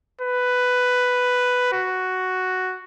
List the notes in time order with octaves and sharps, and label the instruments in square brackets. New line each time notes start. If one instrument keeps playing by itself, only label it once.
[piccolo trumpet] B4
F#4